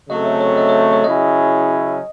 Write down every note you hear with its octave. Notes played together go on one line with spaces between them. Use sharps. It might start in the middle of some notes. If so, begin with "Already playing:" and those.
C#3 F#3 A3 C4 D#5
C#5
C#5
D#5
C#5
C#5
C#5
C#3 F#3 C#4 E4 G#4 D#5